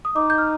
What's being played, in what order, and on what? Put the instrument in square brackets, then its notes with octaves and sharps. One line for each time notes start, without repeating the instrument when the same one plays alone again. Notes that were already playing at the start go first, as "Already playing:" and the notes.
[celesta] D#6
[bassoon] D#4 [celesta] D6
[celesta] G6
F6